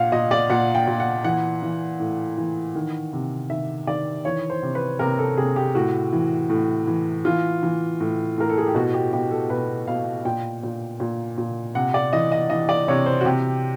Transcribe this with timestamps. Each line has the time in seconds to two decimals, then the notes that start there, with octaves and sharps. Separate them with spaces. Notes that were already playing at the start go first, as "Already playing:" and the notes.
Already playing: A#2 F5 F#5
0.12 A#2 D#5
0.31 D5
0.50 A#2 F#5
0.75 G5
0.87 A#2
1.00 F#5
1.24 E3 F#5
1.62 E3
2.00 A2
2.37 E3
2.75 D#3
3.13 C3
3.50 D#3 E5
3.87 D#3 D5
4.25 E3 C#5
4.50 C5
4.62 C3
4.75 B4
4.99 C3 A#4
5.19 A4
5.37 C3 G#4
5.56 G4
5.75 A2 F#4
6.12 E3
6.50 A2
6.87 E3
7.25 E3 F4
7.63 E3
8.00 A2
8.38 A2 A#4
8.50 A4
8.58 G#4
8.67 G4
8.75 B2 F#4
8.94 G4
9.13 B2 G4
9.31 A4
9.50 B2 B4
9.88 B2 F5
10.25 A#2 G5
10.63 A#2
11.00 A#2
11.38 A#2
11.75 C3 F#5
11.94 D5
12.13 E3 D#5
12.32 D#5
12.50 E3 D#5
12.69 D5
12.88 C3 C#5
13.06 C5
13.21 F#4
13.25 C3 G4